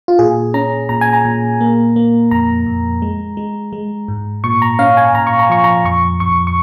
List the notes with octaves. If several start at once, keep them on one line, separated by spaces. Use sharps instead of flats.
F4
A#2 G#4
C#4 A#5
A#2 A#5
G#5
A#5
A#2
A#3
A#3
F2 A#5
F2
G#3
G#3
G#3
G#2
A#2 C#6
A#5
C#4 F5
G#5
A#2 A#5
C#6
A#5
F3 C#6
A#5
F2 C#6
F2 C#6
C#6